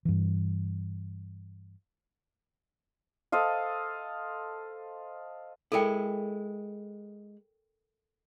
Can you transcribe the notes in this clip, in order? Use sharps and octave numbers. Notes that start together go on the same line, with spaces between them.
G2 E3
A4 C5 D#5 F5
G#3 E4 A4 A#4 G5